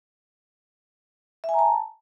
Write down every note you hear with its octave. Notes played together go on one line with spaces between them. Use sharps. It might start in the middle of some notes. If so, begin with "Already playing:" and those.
E5
G#5
A#5
A5